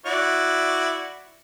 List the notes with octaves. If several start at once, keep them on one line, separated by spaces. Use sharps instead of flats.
E4 F#4 D5